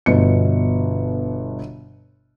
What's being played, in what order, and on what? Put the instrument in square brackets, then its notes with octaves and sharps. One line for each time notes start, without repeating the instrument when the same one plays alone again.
[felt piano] G1 B2 C#7